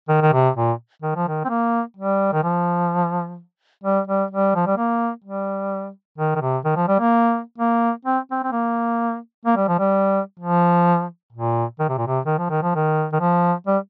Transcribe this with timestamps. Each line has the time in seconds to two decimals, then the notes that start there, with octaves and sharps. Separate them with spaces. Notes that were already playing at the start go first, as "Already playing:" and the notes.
0.08 D#3
0.22 D#3
0.33 C3
0.56 A#2
1.02 D#3
1.16 F3
1.28 D#3
1.45 C4
1.49 A#3
1.97 G3
2.33 D#3
2.43 F3
3.84 G3
4.08 G3
4.31 G3
4.55 F3
4.67 G3
4.78 A#3
5.24 G3
6.18 D#3
6.36 D#3
6.41 C3
6.65 D#3
6.76 F3
6.88 G3
7.00 A#3
7.58 A#3
8.05 C4
8.32 C4
8.44 C4
8.52 A#3
9.45 A#3
9.57 G3
9.68 F3
9.79 G3
10.40 F3
11.32 A#2
11.80 D#3
11.89 C3
11.98 A#2
12.07 C3
12.26 D#3
12.38 F3
12.50 D#3
12.63 F3
12.75 D#3
13.13 D#3
13.20 F3
13.67 G3